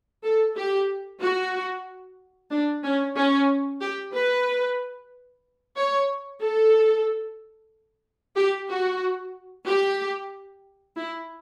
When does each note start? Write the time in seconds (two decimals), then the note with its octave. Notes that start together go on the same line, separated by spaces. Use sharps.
0.23 A4
0.56 G4
1.21 F#4
2.51 D4
2.84 C#4
3.16 C#4
3.81 G4
4.13 B4
5.76 C#5
6.41 A4
8.36 G4
8.68 F#4
9.66 G4
10.96 E4